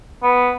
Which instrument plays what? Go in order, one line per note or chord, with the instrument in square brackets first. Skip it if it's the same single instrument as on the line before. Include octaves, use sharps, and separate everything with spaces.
[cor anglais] B3